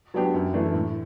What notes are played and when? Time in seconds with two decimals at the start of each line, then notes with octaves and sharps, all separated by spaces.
0.14 F#3 B3 D4 G4
0.34 F#2
0.53 E3 A3 D4
0.74 A2